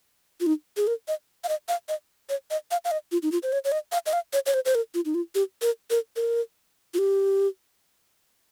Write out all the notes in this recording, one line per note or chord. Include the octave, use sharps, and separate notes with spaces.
F4
D#4
G#4
A#4
D#5
F5
D#5
F5
D#5
C#5
D#5
F5
F5
D#5
F4
D#4
F4
C5
C#5
C#5
D#5
F5
D#5
F5
C#5
C#5
C5
C5
A#4
F4
D#4
F4
G4
A#4
A#4
A#4
F4
G4